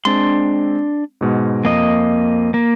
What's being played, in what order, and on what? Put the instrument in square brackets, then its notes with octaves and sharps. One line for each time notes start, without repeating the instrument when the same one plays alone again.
[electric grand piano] G#3 C4 [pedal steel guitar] D4 C6
[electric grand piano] G#2 B2 G#3
[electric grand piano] F2 [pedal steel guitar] A#3 D#5
[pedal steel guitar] A#3